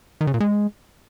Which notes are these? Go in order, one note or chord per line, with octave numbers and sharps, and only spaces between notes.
D#3
C#3
A#2
G#3